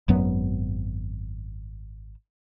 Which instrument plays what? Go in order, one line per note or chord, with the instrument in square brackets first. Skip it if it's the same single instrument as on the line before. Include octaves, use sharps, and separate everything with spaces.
[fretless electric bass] G#1 F#2 F#3 B3